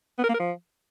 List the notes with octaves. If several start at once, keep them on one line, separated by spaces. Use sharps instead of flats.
B3
A#4
A#3
A#4
F3